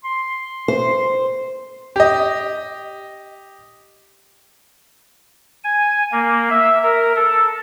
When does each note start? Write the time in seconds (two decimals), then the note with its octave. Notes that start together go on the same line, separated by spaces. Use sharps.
0.05 C6
0.68 C5
1.96 G4 D#5
5.64 G#5
6.12 A#3
6.50 E5
6.83 A#4
7.16 A4